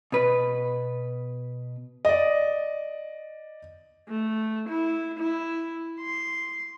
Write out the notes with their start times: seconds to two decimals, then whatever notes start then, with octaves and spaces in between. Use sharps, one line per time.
0.12 B2 B4
2.05 D5 D#5
4.08 A3
4.69 E4
5.19 E4
6.00 C6